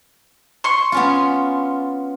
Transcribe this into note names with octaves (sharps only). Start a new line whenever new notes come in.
C6 C#6
B3 C#4 F4